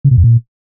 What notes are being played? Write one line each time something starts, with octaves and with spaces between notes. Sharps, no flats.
C#3
B2
F2
A#2